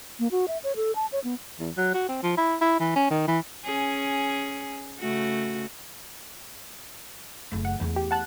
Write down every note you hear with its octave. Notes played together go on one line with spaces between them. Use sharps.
A#3
F#4
E5
C#5
A4
A5
C#5
B3
E2
F#3
F#4
C4
F3
E4
E4
E3
C#4
D#3
E3
C#4 G#4
C#3 A3 F#4
F#1 A3
F#5
E2 A3
G4
F#5 A5 F#6